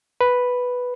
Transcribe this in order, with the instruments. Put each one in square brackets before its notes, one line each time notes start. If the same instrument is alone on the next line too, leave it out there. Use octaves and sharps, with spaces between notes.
[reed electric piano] B4